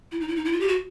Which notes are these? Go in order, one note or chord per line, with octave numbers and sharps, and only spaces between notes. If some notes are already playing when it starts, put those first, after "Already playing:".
E4
D#4
E4
D#4
E4
F4
G4
F#4